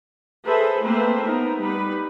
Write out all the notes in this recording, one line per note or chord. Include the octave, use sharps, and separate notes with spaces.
G#4 A4 B4 C5 E5
A3 A#3 C4 B4 C5 E5
B3 D#4 A#4
G3 D#4 B4